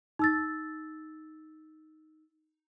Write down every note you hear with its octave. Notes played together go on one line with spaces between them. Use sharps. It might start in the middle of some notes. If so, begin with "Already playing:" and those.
D#4 E6 A6